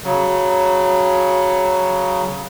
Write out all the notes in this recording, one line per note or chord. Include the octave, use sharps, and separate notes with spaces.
C#3 F#3